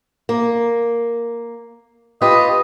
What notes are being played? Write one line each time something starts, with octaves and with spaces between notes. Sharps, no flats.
A#3
F4 G4 B4 D#5